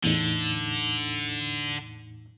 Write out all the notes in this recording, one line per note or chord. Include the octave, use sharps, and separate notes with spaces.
E2 A2 D3 D#4